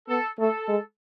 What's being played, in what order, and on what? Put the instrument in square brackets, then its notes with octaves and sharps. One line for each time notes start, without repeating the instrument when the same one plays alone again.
[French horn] B3 [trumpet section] A4
[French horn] A3 [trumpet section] A4
[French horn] G#3